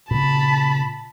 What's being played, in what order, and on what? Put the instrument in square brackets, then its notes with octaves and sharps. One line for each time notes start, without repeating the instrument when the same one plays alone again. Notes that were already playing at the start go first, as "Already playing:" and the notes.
[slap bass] A#2 C#3 [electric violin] A5 B5